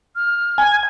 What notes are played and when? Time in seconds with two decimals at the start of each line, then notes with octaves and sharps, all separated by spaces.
0.16 F6
0.58 G#5